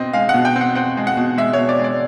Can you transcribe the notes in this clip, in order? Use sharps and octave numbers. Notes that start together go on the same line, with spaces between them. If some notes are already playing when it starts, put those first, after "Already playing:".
Already playing: B2 C4 D#5
G#3 F5
F#5
B2
G5
C4
F#5
C4 F#5
G#3
F#5
B2
G#3 E5
B2 C#5
D5
G#3 D5